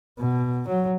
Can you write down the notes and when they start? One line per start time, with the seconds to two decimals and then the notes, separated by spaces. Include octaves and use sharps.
0.19 B2
0.68 F#3